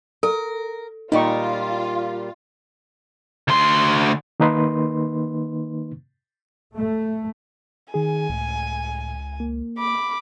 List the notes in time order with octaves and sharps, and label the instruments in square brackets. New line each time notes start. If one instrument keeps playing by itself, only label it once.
[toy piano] A4 [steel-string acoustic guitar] A#4
[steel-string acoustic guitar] A#2 G3 [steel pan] D#4 C#6 [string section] F4
[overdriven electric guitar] D2 C6
[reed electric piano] D#3 A#3 D#4 B4 C6
[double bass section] A3
[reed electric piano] D#3 G#4 [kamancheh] G#5
[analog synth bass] C#2 [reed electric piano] A2
[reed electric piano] A#3
[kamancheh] B5 D6